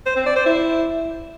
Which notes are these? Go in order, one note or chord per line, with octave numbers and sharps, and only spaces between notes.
C5
C4
D5
C5
E4